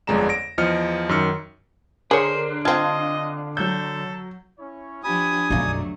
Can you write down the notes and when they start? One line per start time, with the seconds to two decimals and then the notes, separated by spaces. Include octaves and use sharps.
0.07 G1 F2 G#3 D5 A#5 E7
0.29 A#6 D7
0.58 E2 F3 D#5 F6 C#7
1.09 F#2 D#3 E6 F6 C#7
2.11 D3 D4 G#4 A#4 C5 C#5
2.65 C4 F4 D#5 F5 A5 G#6
3.57 F#3 A4 G6
4.59 C#4 E4 C#5
5.04 F3 D4 G4 G#5 B5 D#6
5.50 B1 F#2 D3 F#3 A3 D#4 D5 A#5